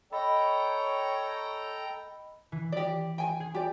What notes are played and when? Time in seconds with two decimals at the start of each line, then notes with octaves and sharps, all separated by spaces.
0.13 A4 C#5 D#5 G5 A#5 B5
2.52 E3
2.72 G4 D5
3.18 G5 G#5
3.40 G#4
3.55 G4 D5